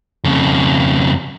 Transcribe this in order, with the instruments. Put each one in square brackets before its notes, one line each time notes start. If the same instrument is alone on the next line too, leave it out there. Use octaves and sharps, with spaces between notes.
[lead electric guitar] F2 C#3